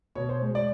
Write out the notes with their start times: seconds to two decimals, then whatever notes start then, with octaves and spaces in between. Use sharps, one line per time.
0.15 B2 C#5
0.29 C5
0.42 G#3
0.55 D5